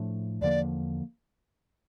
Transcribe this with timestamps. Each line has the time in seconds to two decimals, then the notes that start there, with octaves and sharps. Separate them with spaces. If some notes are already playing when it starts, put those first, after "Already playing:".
Already playing: A2 F3 A3 D4
0.42 E2 D3 F3 A#3 D5